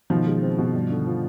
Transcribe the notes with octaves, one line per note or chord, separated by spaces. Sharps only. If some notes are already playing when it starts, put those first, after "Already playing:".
B2 D#3 F3
G#3
C4
B2
G2
D3
F3